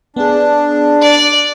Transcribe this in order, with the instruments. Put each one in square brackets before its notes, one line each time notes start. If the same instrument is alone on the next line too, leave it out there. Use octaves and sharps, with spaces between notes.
[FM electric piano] B3 G#4 [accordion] D4
[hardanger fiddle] D5